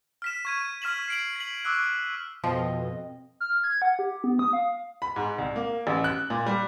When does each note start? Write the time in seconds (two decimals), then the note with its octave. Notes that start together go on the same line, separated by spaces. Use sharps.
0.22 F6 B6 E7
0.45 C#6 G#6 D#7
0.82 C#6 F6 B6 E7 F#7
1.08 C7 D7 F#7
1.36 B6 F#7
1.65 C#6 D6 E6 F#6
2.44 F2 B2 F3 D#5
3.40 F6
3.64 G#6
3.82 F#5
3.99 G4
4.24 B3
4.39 D#6
4.53 F5
5.02 B5
5.16 G#2
5.38 C2
5.56 A#3
5.87 A1
6.04 F#6
6.30 A#2
6.46 G3